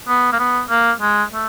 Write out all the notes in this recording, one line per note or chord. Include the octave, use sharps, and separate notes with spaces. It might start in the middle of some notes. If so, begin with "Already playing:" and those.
B3
A#3
B3
A#3
G#3
A3